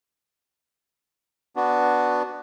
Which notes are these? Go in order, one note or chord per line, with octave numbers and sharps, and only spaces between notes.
B3 D4 F#4